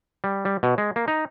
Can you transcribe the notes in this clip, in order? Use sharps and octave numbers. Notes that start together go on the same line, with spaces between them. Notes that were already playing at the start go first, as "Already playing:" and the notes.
G3
G3
B2
G#3
A#3
D#4